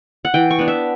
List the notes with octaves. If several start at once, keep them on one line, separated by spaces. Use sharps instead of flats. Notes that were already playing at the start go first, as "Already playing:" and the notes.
F#5
E3 G5
C#6
B3 D4
E5